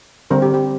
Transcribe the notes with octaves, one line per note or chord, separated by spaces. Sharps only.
D3 G3 C4 A#4
G4
G4